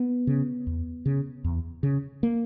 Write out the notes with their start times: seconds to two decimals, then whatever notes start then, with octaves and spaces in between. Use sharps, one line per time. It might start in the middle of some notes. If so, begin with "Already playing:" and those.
Already playing: B3
0.27 C#3
0.67 E2
1.06 C#3
1.44 E2
1.83 C#3
2.23 A#3